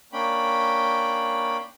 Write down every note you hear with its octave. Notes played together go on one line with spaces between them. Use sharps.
A#3 C#4 D4 G5 B5